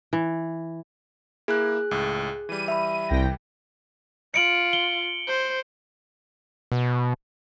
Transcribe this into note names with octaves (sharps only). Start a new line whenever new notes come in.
E3
A#3 E4 G#4 F#6
C#2 A2
E3 G3 D#7
E5 B5
C2 G5 A#6
F4 C#7 D7 F#7
G7
C5
B2